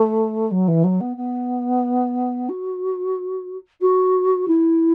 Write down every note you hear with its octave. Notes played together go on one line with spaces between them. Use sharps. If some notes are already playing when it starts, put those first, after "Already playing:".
Already playing: A3
F#3
E3
F#3
B3
B3
F#4
F#4
E4